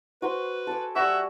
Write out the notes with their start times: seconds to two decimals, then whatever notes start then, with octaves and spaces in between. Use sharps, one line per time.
0.22 F#4 B4 C5 C6
0.67 A4 G#5 D6
0.96 G3 F#4 E5 G#5 C#6